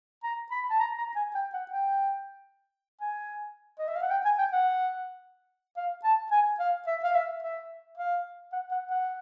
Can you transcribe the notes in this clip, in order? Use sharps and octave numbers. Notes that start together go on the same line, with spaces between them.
A#5
B5
A5
A#5
A#5
G#5
G5
F#5
G5
G#5
D#5
E5
F5
F#5
G5
G#5
G5
F#5
F5
A5
G#5
F5
E5
F5
E5
E5
F5
F#5
F#5
F#5